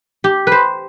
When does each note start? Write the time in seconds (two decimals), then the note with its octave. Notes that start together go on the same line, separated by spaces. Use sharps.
0.24 G4
0.47 B4 C5